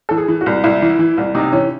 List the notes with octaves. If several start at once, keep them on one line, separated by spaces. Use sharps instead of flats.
E3 A4
G#4
E3
F#4
C2
C2 E4
E3
E3
C2
C3 D#4
E3 C#4